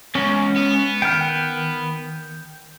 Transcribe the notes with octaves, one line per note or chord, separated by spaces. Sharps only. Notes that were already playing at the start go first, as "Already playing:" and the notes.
E2 G#3 C#4
B3
D#3 G5 F6